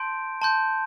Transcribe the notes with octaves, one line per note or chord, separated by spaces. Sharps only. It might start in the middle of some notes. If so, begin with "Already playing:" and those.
Already playing: A5 C6 G6 D7
A5 C6 G6